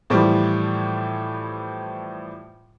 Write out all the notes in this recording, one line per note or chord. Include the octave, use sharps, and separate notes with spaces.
A2 E3 F3 G3